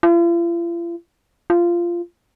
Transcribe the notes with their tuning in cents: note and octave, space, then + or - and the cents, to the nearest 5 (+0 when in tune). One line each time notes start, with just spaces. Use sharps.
F4 -45
F4 -15